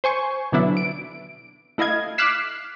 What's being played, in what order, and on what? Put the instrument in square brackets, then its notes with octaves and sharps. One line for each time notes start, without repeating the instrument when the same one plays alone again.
[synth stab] C5 G#5 C#6
B2 D3 F#3 B3 D4 E4
D7
A3 E4 D#5 F5 G#6
D6 F6 F#6 B6 C7 E7